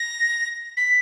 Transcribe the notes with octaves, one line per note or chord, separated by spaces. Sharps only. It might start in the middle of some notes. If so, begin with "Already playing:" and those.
Already playing: A#6
B6